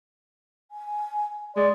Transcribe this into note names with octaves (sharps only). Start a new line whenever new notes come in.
G#5
G#3 D5 C6